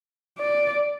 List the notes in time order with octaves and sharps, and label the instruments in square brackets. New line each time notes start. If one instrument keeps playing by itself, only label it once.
[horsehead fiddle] D5